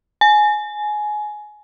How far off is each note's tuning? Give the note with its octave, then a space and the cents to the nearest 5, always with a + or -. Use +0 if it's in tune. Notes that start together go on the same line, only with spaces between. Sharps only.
G#5 +20